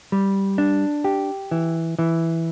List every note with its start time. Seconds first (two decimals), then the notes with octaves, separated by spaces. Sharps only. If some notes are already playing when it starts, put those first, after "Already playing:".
0.12 G3
0.58 D4
1.04 G4
1.51 E3
1.99 E3